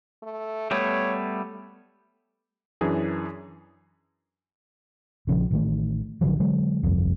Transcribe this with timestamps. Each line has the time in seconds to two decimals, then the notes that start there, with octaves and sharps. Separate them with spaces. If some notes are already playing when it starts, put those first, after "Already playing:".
0.23 A3
0.71 G3 A3 B3 C#5
2.81 F#2 E3 D4 G#4
5.27 A#1 C#3 F3
5.51 A1 D#3 A3
6.21 A1 D3 F3 F#3
6.40 D3 F#3 G#3
6.83 G1 C2 F2